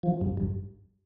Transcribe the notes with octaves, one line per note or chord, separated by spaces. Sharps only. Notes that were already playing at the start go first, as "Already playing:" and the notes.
F3
G2
G2